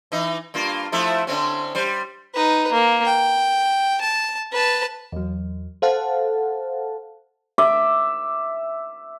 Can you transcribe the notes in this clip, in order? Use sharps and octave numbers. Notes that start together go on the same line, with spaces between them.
E3 D#4
G2 A#3 F4
F3 A3 E4
D3 C4 C#4
G3 C5
D#4 B4
A#3
G5
A5
B4 A5
E2 F#3
A4 C5 F5 F#5 A5
E5 D6